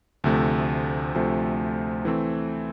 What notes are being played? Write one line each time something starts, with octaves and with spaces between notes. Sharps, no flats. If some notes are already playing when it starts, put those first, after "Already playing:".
D2 C3 F3 A3
D2 C3 F3 A3
E3 A3 C4